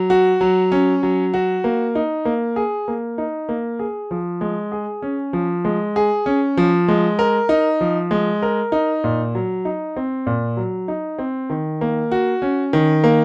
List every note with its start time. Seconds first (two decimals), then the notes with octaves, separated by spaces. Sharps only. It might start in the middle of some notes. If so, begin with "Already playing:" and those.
Already playing: F#3
0.10 F#4
0.41 F#3
0.72 C#4
1.03 F#3
1.34 F#4
1.64 A#3
1.95 D#4
2.25 A#3
2.56 G#4
2.88 A#3
3.18 D#4
3.49 A#3
3.79 G#4
4.11 F3
4.41 G#3
4.72 G#4
5.02 C#4
5.33 F3
5.65 G#3
5.96 G#4
6.26 C#4
6.57 F3
6.88 G#3
7.19 A#4
7.49 D#4
7.81 F3
8.11 G#3
8.42 A#4
8.72 D#4
9.04 A#2
9.35 F#3
9.65 D#4
9.97 C4
10.27 A#2
10.57 F#3
10.88 D#4
11.19 C4
11.50 D#3
11.81 A#3
12.12 F#4
12.42 C#4
12.73 D#3
13.04 A#3